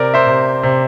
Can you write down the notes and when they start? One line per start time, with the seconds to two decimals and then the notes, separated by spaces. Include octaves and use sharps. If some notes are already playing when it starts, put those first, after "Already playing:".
Already playing: C3 A#4 D5
0.14 C5 E5
0.27 C3
0.63 C3